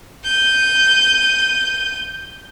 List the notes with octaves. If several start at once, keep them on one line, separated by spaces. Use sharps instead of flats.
G6 D#7